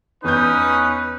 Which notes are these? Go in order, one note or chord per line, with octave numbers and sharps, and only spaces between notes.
E2 C#4 D#4 B4 G6